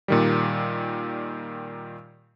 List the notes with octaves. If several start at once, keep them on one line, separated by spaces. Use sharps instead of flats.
A#2 D#3 G3